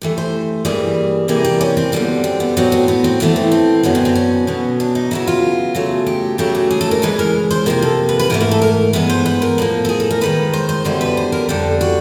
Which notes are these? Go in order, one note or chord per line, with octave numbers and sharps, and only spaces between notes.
G2 E3 A3
C5
G2 E3 G3 A#3 G#4
C3 E3 G3 A#3 G#4
G4
C#4
C4
F#2 D3 G3 B3 D4
C4
B3
A2 F#3 B3 C4
C4
B3
C4
A2 E3 A3 B3
C4
C4
F#2 D3 F#3 B3 C#4
C4
C4
C#4
B2 F#3 B3
D4
D#4
C#3 F#3 B3 E4
F4
C#3 F#3 A3
G4
C#3 F#3 A3 G4
G4
G#4
A4
A#4
C#3 E3 G#3 B4
A#4
C5
C3 F3 A#3 A#4
A4
B4
B4
G#2 E3 A3 A#4
A#4
A4
A#4
G2 E3 G#3 B3 B4
C5
B4
A#4
A2 F3 A#3
A4
G#4
A4
A#4
G2 D#3 G#3 B4
C5
C5
F#2 D3 G3 B3 C5
B4
C5
A#4
F2 D3 G3 A4
F#4